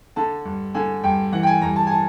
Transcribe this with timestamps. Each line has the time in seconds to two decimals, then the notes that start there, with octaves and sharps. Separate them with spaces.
0.16 D3 A5
0.45 G2
0.75 D3 G#5
1.04 G2 G5
1.32 E3 F#5
1.43 G5
1.47 G#5
1.62 G2 A#5
1.76 A5
1.87 G#5
1.91 A5